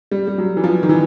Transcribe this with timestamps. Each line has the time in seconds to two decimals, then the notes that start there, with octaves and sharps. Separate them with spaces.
0.11 G3
0.27 G3
0.38 F#3
0.57 E3
0.64 F3
0.83 D#3
0.89 E3